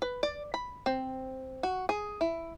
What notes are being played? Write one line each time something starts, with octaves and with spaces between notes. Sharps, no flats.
B4
D5
B5
C4
F#4
G#4
E4